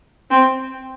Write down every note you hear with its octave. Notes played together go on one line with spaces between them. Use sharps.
C4